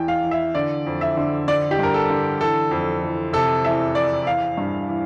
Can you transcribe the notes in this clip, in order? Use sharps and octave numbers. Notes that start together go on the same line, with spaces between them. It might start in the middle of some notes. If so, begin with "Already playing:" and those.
Already playing: E2 E3 G5
F5
E3
E5
D3 D5
F2
E5
D3
D3 D5
G4
G2 A#4
A4
D3
E3 A4
F2
E3
C3 A4
E2 E5
E2 D5
E3 F5
G2
E3